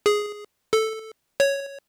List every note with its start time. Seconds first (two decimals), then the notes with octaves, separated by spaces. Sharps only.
0.06 G#4
0.73 A4
1.40 C#5